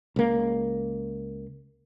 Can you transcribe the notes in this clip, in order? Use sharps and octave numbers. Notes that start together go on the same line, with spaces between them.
C#2 A#3